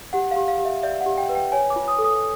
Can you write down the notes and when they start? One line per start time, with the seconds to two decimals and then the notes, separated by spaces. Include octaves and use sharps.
0.13 G4 F#5
0.31 F5
0.36 G4
0.48 F5
0.59 G4
0.65 E5
0.83 D5 E5
1.01 F#5
1.06 G4
1.18 G5
1.29 B4
1.35 G5
1.52 C#5 G#5
1.70 D6
1.76 F4
1.88 D#6
1.99 A4
2.05 D#6